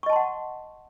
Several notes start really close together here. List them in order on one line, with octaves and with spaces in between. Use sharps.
C#6 D#5 A5 C6 F#5